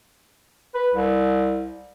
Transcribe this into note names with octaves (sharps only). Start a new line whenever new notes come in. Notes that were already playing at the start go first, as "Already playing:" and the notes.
B4
C2